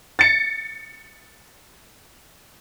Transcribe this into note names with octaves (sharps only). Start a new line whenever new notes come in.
A6 C#7